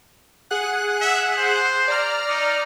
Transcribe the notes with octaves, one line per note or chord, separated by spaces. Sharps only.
G#4 F#5 F#6
E5
C5
D5 A#5 F6
D#4